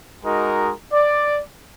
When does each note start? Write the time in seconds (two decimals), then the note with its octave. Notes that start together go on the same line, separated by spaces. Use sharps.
0.24 G#3 D#4 F#4 A#4
0.93 D5